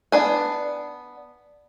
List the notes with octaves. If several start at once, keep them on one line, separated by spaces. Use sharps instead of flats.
B3 D4 G#5